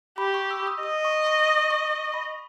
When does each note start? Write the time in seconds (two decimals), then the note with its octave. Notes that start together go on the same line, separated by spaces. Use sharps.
0.18 G4 B5
0.34 C#6
0.51 E6
0.67 D#6
0.83 D#5 D#6
1.05 C#6
1.27 C#6
1.48 D#6
1.71 C#6
1.92 C#6
2.14 B5